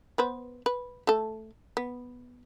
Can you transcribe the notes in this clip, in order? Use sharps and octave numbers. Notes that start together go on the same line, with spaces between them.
B3 B4 C5
B4
A3 A4
B3